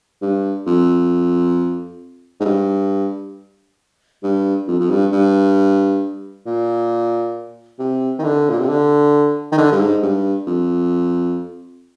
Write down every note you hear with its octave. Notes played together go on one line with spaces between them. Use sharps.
G2
F2
G#2
G2
G2
F2
F2
G2
G2
A#2
C3
D#3
D3
A#2
C3
D3
D#3
D3
G2
G#2
G2
F2